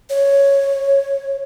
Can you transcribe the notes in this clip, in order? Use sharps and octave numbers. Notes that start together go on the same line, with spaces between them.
C#5